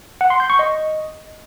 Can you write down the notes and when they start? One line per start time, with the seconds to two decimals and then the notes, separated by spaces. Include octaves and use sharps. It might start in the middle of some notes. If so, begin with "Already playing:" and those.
0.21 F#5
0.30 C6
0.40 G6
0.50 C#6
0.59 D#5